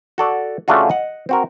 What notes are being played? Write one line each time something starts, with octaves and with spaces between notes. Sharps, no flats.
F#4 A4 D5
C#3 A3 D4 F4 F#4
D#5 F#5
C4 F#4 A#4